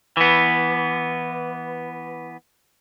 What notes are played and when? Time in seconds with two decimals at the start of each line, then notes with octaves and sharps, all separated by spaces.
0.17 E3 B3